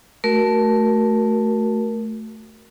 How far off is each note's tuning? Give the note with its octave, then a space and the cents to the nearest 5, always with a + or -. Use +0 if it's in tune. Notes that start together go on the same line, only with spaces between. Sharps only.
A3 +0 F#4 +20 A#4 +10